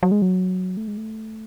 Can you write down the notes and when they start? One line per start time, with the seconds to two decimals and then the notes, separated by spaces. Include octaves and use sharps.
0.03 F#3
0.12 G#3
0.22 F#3
0.77 A3
0.88 G#3
0.97 A3